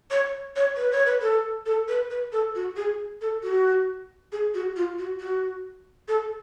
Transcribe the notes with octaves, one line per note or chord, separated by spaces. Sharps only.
C#5
C#5
B4
C#5
B4
A4
A4
B4
B4
A4
F#4
G#4
A4
F#4
G#4
F#4
F4
F#4
F#4
A4